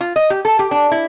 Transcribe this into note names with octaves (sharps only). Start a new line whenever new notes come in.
F4
D#5
G4
A4
G4
D4
E4